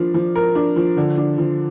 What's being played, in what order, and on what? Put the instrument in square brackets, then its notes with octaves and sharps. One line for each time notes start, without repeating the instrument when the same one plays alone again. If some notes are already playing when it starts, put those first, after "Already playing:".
Already playing: [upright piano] F3 D4 A#4
F3
A#4
D4
F3
D3
D4
F3